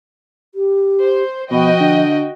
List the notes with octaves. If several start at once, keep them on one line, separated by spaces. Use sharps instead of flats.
G4
C5
B2 F3 F#4 D#5 G5
D3